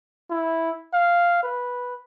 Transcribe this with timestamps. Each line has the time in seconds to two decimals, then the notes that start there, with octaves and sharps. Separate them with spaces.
0.30 E4
0.94 F5
1.43 B4